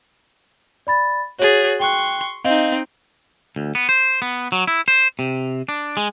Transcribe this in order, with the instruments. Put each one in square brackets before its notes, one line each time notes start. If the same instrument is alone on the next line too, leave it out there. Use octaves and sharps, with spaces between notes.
[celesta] D5 B5 A6
[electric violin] F#4 G#4 [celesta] C#5 A6
[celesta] G5 F#6 [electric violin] C6 C#6
[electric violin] C4 D#4 [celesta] D#5 F5
[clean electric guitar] D2
B3
C5
B3
F#3
E4
C5
C3
D4
G#3